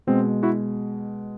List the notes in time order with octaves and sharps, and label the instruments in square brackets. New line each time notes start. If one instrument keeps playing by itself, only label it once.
[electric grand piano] B2 G#3 C4
E4 F#4